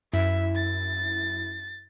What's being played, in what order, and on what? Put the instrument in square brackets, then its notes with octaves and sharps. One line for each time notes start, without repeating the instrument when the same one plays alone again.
[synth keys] F#2 E4 [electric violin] E5
[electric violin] A6